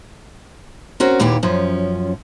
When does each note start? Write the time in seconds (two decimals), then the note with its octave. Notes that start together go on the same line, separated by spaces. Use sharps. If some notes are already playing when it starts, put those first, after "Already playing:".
1.00 C4 C#4 F#4 A#4
1.20 D#2 A#2 E3 F#4 G4
1.43 F#2 F3 C#4